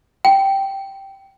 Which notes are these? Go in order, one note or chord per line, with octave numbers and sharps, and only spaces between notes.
G5